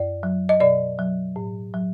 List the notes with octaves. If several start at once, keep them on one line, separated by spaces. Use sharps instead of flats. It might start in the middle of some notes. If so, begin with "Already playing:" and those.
Already playing: F#2 D5
F#3
D#5
B2 D5
F#3
A2
F#3